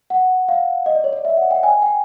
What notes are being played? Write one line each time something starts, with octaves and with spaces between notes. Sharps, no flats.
F#5
F5
D#5
D5
C#5
D5
E5
F#5
G5
G#5
G5